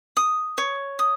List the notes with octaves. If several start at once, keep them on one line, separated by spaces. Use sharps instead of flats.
D#6
C#5
D#6